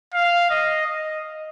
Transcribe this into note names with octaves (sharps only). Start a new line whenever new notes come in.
F5
D#5
D#5